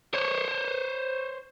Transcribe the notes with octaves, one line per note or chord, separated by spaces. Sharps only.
C5 C#5